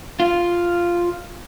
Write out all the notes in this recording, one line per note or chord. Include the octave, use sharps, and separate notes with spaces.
F4